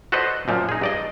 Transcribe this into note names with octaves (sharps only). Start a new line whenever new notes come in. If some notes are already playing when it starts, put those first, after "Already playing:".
F#4 A4 B4 C5 D5 D#5
F#2 A#2 F3
D#4 G#4
G2 D5 D#5